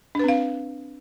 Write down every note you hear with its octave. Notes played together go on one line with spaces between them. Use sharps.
C4 D4 B4 F5